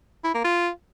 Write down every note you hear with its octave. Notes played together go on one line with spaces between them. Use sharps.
E4
A#3
F4